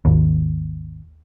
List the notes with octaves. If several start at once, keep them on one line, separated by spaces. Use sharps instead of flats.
G#1 D#2